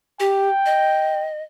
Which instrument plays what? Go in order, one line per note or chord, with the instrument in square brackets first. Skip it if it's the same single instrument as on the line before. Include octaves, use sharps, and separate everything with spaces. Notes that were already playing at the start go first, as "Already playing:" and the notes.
[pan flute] G4 [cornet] G5
[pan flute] D#5